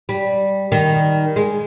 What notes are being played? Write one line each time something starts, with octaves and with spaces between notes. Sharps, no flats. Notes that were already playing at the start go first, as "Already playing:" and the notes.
G3
D#3 G3
G#3